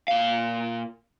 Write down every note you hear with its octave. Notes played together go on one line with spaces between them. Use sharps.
A#2 F5